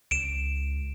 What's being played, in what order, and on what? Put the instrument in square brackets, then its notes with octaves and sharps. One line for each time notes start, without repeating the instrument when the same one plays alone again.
[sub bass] C#2 [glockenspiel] D7 E7